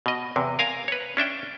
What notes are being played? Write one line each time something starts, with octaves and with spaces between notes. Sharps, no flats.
B2 D#5
E2 C3
A#4 F5 G#5 A#5
B4 C#5
C#4 D4 E5 G5